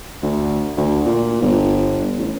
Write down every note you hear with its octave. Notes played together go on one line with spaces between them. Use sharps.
D2
D2
A#2
G1
A1